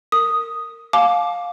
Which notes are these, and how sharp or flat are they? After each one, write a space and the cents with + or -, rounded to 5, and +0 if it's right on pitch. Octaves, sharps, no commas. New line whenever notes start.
A#4 -20 D#6 +0
F5 +15 A5 -40 D6 +0